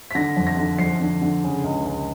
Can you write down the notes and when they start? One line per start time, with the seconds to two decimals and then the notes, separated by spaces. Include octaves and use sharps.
0.11 B6
0.15 D3 A#6
0.37 F2
0.47 A#6
0.57 D3
0.79 F2 C7
1.00 D3
1.21 D3
1.44 C#3
1.64 C#2
1.86 C#2